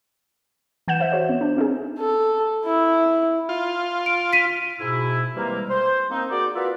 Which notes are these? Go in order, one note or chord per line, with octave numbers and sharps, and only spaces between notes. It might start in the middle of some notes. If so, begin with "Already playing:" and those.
E3 F#5 G6 E7
C5 E5
F#4 C5 C#5
B3
D4
C4 D#4 G4 G#4
A4
E4
F4
D7
B6 D#7
G#2 B2 E4
C3 E3 G3 G#3 A#3
C5
A#3 C4 D#4
A#3 F#4 G#4 D5
F4 F#4 A#4 B4 D5 E5